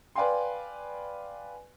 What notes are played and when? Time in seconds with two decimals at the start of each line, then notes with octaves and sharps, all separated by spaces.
0.16 B4 D5 F5 G5 G#5 C6